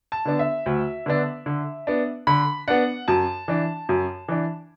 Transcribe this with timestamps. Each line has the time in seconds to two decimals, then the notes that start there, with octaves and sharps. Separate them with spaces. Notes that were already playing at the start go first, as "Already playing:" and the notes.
0.12 A5
0.25 D3 B3 D4
0.39 E5
0.66 D2
1.06 D3 B3 D4
1.46 D3
1.87 B3 D4
2.27 D3 B5
2.68 B3 D4 F#5
3.08 F#2 A5
3.48 E3 D4
3.89 F#2
4.28 E3 D4